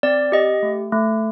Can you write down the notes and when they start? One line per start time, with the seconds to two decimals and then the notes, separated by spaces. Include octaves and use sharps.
0.03 C4 D5
0.32 G4 D#5
0.63 A3
0.92 A3